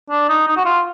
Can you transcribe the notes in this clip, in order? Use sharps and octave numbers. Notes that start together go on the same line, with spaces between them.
D4
D#4
D#4
F#4
F4